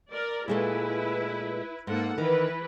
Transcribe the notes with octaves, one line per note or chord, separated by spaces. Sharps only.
A#4 D5
A#2 G#3 A3 E4 B4
G#2 A#3 A4 F#5
D#3 E3 B4